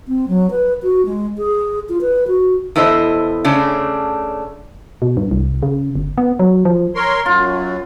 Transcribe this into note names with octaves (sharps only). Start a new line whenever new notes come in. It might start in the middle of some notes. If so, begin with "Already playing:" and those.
C4
F#3
B4
F#4
G#3
G#4
F4
B4
F#4
E2 E4 A4 C5 D#5
C#3 A3 C#4 D4
B2
G2
C2
C#3
G1
B3
F#3
F3
A#4 C#5 C6
F#2 F#3 F4